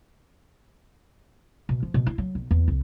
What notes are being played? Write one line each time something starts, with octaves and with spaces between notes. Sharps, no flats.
B2
F3
B2
E4
F#3
B1
E2
C2